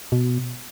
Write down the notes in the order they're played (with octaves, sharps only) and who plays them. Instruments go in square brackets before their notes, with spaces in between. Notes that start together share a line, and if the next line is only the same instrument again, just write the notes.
[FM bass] B2